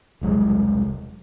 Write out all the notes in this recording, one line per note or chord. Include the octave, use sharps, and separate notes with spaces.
E1 C2 F#3 G#3